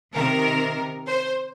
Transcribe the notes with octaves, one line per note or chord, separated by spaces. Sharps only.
C3 D#3 A#4
C5